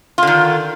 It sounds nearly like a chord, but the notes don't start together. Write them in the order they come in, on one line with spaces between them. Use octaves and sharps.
F4 D3 D#3